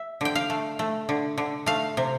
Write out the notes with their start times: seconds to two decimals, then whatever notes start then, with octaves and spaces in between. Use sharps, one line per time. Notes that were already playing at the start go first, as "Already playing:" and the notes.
Already playing: E5
0.21 D3 G5
0.35 F5
0.50 A3
0.79 A3
1.09 D3
1.38 D3
1.66 A3 F5
1.97 C3